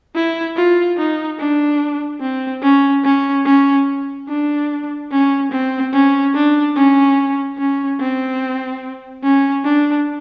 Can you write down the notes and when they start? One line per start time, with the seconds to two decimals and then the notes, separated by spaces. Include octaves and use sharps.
0.15 E4
0.56 F4
0.98 D#4
1.39 D4
2.21 C4
2.62 C#4
3.04 C#4
3.45 C#4
4.28 D4
5.11 C#4
5.52 C4
5.93 C#4
6.34 D4
6.76 C#4
7.58 C#4
8.00 C4
9.23 C#4
9.64 D4